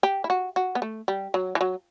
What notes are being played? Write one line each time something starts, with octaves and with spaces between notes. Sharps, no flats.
G4
E4
F#4
F#4
B3
A3
G3
F#3
E3
F#3